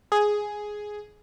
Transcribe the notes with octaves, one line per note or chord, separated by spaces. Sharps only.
G#4